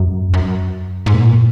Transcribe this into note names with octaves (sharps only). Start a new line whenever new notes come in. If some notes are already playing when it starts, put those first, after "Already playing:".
Already playing: F#2
F#2
G#2
A#2